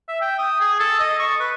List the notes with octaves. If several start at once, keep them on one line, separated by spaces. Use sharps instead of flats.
E5
G5
D#6
G#4
A4
D#5
C#6
B4